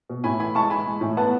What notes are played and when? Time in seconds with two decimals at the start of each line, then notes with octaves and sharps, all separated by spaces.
0.10 B2
0.24 A2 G#5 B5
0.39 E3 G#5 B5
0.55 G#3 A5 C#6
0.70 E3 G#5 B5
0.86 G#3
1.01 A2
1.17 B3 F#5 A5